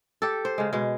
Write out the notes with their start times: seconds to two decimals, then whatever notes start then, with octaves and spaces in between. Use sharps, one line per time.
0.22 G4 A4
0.45 C5
0.58 C#3 G#3
0.73 B2 G#3